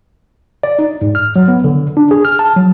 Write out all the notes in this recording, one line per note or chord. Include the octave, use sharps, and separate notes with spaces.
D5
D#4
G#2
F6
F#3
B3
D3
D4
G#4
F6
A5
F#3